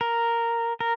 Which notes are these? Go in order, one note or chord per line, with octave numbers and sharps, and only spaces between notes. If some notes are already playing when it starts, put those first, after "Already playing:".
A#4
A#4